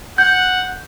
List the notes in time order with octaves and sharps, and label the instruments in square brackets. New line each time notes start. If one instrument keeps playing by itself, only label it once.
[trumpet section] F#5 [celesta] G6